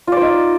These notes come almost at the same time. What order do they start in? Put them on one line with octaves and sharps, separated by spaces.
F4 D5 C5 D#4